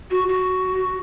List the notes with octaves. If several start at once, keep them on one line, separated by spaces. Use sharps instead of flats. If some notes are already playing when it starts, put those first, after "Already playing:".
F#4
F#4